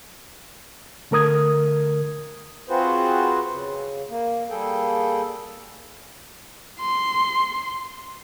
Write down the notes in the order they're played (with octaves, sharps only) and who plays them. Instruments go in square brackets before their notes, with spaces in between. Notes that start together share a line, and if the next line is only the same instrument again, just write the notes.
[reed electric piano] D3 A3 A#4 D#6 G#6
[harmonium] C4 F4 F#4 G#4 B4 C5
C#3
A#3
G3 A#3 G#4 A4 G5
[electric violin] C6